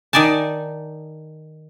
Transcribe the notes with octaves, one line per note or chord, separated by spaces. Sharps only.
D#3 D#4 D5 G#5 A5